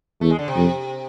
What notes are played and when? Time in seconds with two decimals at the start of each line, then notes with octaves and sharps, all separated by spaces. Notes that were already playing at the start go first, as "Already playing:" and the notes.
0.21 E2 A3
0.30 G#3
0.39 D3
0.48 C3
0.56 F2